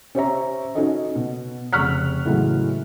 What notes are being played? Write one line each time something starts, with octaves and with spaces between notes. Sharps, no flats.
C#4 G4 C5 C#5 E5 A#5
C#4 D#4 F#4 A4 D#5
B2
F1 C#3 C#6 F6 F#6 B6
A2 C#3 E3 F#3 G#3